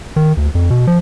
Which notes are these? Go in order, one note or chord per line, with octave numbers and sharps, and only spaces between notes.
D#3
D2
F2
B2
F3